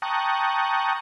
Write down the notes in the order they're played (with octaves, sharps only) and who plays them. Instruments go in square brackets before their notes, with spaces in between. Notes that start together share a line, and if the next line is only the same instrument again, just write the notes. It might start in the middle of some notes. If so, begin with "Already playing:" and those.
[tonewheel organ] G5 A5 A#5 C#6 D#6 F#6